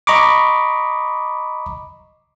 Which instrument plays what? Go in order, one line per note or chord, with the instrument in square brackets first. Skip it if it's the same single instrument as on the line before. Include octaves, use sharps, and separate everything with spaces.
[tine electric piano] D#5 A#5 B5 C#6 D6